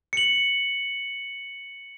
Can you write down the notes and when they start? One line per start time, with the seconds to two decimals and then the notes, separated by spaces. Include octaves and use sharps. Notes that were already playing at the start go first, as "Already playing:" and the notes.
0.13 C#7 F#7